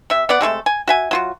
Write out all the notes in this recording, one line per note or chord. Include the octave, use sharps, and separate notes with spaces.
C3 E5
B3 D5 F#5
C3 G#3 A3 A4
G#5
F#4 E5 G#5
F#3 F4 F#4